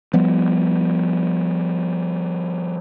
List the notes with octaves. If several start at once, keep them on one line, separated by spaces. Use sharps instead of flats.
F3 G3 B3